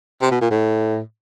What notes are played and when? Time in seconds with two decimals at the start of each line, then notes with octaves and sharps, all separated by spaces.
0.22 C3
0.31 B2
0.41 A#2
0.51 A2